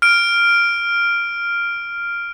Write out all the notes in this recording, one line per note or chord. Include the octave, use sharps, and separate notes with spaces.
F6 D7